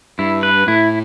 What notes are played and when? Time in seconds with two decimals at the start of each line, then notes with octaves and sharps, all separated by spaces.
0.19 G2 E4
0.43 B4
0.68 A2 E4